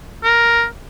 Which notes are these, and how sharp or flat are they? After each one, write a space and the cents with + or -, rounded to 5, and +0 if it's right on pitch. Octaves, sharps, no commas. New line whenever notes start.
A#4 +5